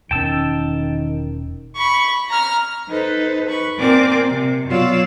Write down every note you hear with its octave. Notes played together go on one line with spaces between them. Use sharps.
E1 D#3 C#4 G5 A5 E6
B5 C#6
A#5 F6
D#4 A4 B4 C5
B4 B5 C#6
A#2 C4 A#4 D5 G#5 D6
C3
B2 F#3 F4 C#5 D5 E6